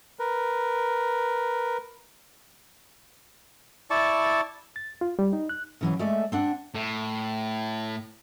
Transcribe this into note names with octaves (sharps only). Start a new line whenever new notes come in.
A#4 B4
E4 D5 A5 C#6
A6
F4
G3
D#4
F#6
C#3 E3 F#3
G#3 A3 A4 D5 E5
C4 D4 F#5
A2